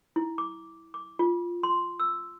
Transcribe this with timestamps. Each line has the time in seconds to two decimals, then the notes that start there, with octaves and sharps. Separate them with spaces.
0.16 E4
0.38 D6
0.94 D6
1.19 F4
1.63 C6
1.99 E6